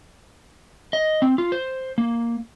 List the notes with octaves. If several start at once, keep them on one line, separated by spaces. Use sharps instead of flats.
D#5
C4
F4
C5
A#3